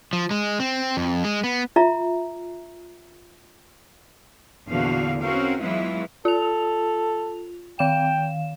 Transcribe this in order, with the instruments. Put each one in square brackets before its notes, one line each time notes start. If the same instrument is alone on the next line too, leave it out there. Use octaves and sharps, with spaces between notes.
[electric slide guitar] F3
G#3
C4
F2
G#3
B3
[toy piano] F4 E5 A#5
[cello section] E2 A#2 D3 F3 F#4 F5
C4 C#4 F#4 A#4 F5
E3 F#3 G#3 B3 E4 F4
[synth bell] F4 F7 [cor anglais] A4
[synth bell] D#3 F5 E7 [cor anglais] G5